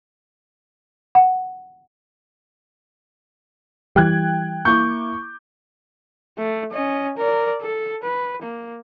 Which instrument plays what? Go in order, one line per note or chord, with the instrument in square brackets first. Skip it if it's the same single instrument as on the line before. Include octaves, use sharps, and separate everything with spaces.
[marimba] F#5
[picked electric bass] E3 G3 [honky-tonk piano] G5 F#6 G#6
[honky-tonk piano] A#3 E4 D6 [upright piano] C#6 G6
[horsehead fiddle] A3
C#4 D#5
A#4 D5
A4
B4
A#3